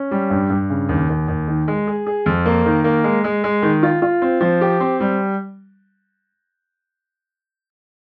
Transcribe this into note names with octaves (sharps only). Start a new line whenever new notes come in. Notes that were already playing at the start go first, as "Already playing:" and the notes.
Already playing: C#4
G3
G2
G2
C#3
D#2
D#2
D#2
D#3
G#3
G#4
G#4
F2
A#3
D#3
A#3
G#3
G#3
G#3
D#3
F4
F4
C4
F3
G4
C4
G3